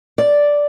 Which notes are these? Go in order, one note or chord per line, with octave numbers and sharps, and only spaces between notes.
D5